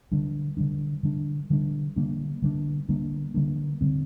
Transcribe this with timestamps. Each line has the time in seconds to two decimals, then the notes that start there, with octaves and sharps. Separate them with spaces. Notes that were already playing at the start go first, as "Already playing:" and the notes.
0.12 D3 G3 D4
0.57 D3 G3 D4
1.03 D3 G3 D4
1.50 D3 G3 D4
1.96 D3 G3 A#3 D4
2.42 D3 G3 A#3 D4
2.89 D3 G3 A#3 D4
3.34 D3 G3 A#3 D4
3.81 D3 G3 C4